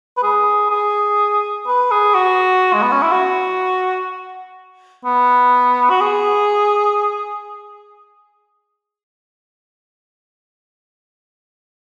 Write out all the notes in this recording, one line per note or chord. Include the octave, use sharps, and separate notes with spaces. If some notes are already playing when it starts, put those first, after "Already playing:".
B4
G#4
G#4
B4
G#4
F#4
G#3
B3
C#4
E4
F#4
B3
F#4
G#4